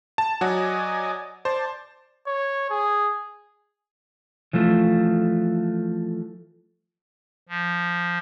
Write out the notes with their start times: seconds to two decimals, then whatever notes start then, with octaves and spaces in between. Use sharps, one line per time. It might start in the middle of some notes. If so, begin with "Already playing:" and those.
0.18 A5
0.41 F#3 F#4 D5 D#5 G#5
1.45 C5 D5 A5
2.27 C#5
2.70 G#4
4.53 E3 F3 A3
7.49 F3